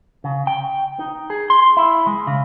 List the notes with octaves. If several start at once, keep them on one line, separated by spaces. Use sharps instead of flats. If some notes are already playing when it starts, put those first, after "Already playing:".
C#3
G5
D#4
G#4
C6
E4
G#3
C#3